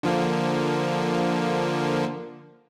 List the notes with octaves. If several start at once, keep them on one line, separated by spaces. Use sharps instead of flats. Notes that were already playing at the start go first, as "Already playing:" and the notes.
D3 F3 A#3